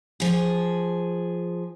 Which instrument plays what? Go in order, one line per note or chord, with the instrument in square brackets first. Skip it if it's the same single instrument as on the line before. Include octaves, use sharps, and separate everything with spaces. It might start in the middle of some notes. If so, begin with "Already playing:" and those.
[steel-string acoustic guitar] F3 G#4